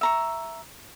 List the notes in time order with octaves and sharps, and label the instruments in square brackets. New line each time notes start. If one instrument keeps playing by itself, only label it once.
[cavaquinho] E5 A#5 C#6